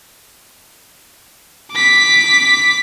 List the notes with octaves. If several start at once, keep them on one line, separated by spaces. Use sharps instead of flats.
D6 B6